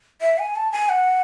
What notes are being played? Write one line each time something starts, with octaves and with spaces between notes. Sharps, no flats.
E5
G#5
A5
G#5
F#5